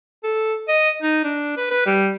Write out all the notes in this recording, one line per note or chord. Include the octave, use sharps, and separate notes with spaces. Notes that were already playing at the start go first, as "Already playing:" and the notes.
A4
D#5
D#4
D4
B4
B4
G3